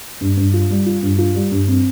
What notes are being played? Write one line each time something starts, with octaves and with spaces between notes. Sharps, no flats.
G2
G2
F4
G3
F4
G2
F4
G3
G2
C4